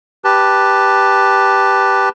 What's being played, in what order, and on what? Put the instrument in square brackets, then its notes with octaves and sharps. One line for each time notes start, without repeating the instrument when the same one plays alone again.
[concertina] G4 B4 A5